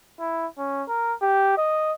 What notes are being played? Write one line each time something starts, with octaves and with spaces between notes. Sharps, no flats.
E4
C#4
A#4
G4
D#5